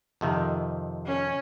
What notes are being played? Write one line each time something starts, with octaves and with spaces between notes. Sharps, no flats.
F2 C3 D#3
C#4